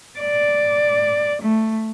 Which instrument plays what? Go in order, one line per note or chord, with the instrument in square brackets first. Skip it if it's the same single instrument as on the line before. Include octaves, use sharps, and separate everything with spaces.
[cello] D5
A3